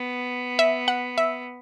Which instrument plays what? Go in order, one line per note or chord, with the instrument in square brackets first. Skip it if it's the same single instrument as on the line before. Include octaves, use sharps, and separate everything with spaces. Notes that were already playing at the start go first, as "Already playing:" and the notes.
Already playing: [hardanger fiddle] B3
[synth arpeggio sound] E5
F#5
E5